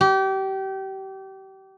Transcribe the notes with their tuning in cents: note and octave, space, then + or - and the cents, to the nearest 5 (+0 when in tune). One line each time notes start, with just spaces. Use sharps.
G4 -30